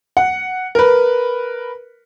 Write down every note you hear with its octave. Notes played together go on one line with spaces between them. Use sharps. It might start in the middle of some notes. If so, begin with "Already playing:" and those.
F#5
A#4 B4